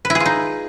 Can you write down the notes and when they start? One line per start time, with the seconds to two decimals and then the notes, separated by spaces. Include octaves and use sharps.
0.05 B4
0.10 E4
0.15 G#4
0.20 F4
0.26 D#4